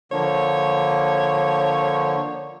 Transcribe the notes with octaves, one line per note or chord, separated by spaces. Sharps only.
D3 F3 A#3 C#5